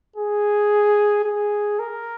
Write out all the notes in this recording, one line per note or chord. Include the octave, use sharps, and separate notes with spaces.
G#4
G#4
A#4